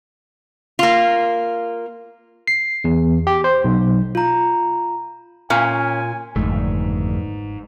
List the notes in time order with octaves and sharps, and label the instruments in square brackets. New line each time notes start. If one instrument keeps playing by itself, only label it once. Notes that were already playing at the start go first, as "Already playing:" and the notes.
[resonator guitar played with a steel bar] A#3 F4
[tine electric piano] C7
E2
G4
C5
B1
[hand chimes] F4 A#5
[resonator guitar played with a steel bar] A#2 [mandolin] C#4 [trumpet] G#5
[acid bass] G1 [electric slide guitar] F2 D#3 A3 [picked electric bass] G#2